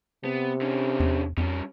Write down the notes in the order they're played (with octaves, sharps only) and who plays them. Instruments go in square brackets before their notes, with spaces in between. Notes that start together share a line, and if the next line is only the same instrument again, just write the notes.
[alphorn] C3 [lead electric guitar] B3
[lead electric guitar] D3 C#4
[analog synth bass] E2
[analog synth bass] F2 [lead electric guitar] G3 C#4